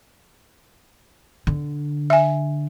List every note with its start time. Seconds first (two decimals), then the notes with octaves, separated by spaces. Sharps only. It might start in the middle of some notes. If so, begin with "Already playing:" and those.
1.47 D3
2.10 E5 G#5